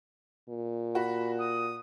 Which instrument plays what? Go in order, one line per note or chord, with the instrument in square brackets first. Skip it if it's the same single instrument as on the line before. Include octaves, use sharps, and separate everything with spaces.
[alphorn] A#2
[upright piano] F#4 [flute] B5
[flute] D#6